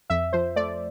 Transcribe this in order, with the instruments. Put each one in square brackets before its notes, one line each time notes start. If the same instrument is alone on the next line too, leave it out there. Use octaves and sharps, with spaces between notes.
[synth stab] F2 E5
F3 C5
A3 D5